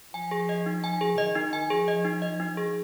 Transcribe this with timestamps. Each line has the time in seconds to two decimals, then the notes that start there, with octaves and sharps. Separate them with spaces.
0.14 F3 G#5
0.31 G#4
0.49 D#5
0.66 D#4
0.84 G#5
1.01 G#4
1.18 D#3 D#5
1.35 D#4
1.53 G#5
1.70 F3 G#4
1.88 D#5
2.05 D#4
2.22 D#5
2.40 D#4
2.57 G#4